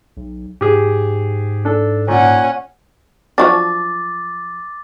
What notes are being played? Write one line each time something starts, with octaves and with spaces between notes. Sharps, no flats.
B1
G#2 G4 G#4
D4 A4
A#2 C#4 F#5
F3 F#3 D4 D6 A6